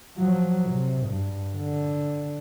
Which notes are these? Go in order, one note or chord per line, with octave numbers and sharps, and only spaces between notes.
F3 F#3
C3
G2
D3